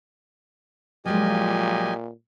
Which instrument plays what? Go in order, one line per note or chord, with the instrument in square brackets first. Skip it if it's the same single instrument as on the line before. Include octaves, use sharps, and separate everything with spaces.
[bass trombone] A#2 [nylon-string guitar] F3 F#3 G#3 [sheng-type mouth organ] G4 D#5 G#5